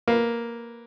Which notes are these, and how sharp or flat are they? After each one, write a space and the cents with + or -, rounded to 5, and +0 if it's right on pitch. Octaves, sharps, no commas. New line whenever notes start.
A#3 +0 B4 +0